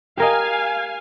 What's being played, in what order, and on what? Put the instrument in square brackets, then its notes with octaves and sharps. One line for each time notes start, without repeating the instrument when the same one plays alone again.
[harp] G4 A#4 D#5 [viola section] F5 G#5